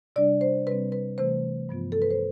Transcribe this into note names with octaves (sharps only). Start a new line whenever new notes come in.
C3 G3 D4 D5
C5
C3 G3 C4 B4
B4
C3 E3 A3 C5
G2 F3 B3 F4
A4
B4
C5